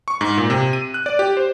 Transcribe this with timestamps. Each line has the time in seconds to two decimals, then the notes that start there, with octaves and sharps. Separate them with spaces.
0.08 C#6
0.21 G#2
0.37 A#2
0.50 C3
0.73 D#7
0.94 F#6
1.06 D5
1.19 G4
1.37 C5